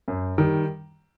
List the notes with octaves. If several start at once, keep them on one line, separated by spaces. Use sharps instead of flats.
F#2
D#3 G3